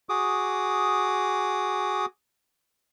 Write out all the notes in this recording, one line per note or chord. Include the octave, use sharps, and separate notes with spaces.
F#4 G#4 D6 D#6